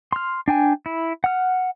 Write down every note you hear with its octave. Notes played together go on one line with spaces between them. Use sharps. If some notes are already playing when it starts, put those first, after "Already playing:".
C6 F6
D4 G5 G#5
E4
F#5 F6